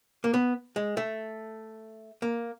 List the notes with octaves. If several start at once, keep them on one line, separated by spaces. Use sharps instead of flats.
A#3
B3
G#3
A3
A#3